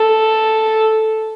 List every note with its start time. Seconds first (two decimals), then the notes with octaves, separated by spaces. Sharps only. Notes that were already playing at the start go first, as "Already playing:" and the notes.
Already playing: A4